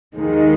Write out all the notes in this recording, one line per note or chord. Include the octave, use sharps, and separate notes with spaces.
D#2 D#3 G#3